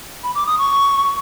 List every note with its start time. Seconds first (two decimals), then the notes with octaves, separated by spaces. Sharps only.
0.24 B5
0.35 D6
0.47 D#6
0.58 C#6